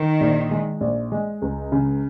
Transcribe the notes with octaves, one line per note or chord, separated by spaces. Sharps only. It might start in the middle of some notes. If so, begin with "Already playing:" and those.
Already playing: D#3
A#1
G#3
A#1
G#3
C#2
C#3